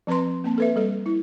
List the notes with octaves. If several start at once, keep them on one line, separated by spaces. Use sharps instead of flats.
F3 C4 B4 A#5 C6
A#3 C4 A5
A4 B4 E5
G3 A4
E4